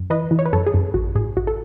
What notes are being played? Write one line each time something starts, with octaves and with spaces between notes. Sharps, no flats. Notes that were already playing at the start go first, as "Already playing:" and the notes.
Already playing: F#2
E3 B4 D#5
E3
C#5
B4
F#2 A4 C#5
G#4
F#2
A1 F#4
A2 G#4
A1 F#4
A4